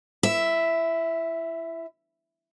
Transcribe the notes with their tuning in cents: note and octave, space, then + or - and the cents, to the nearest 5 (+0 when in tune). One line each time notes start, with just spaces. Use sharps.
E4 +25 E5 +0